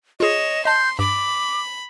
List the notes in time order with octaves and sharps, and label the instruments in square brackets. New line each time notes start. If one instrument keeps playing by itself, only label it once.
[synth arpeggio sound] F4 G#4 [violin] C#5 E7 [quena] D#5
[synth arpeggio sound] D#5 A5 [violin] C6 [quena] G6
[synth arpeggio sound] G2 [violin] B5 [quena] D6